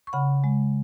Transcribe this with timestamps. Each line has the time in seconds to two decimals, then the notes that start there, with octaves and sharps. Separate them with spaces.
0.07 C#6
0.13 C#3 F#5 B5
0.44 G#3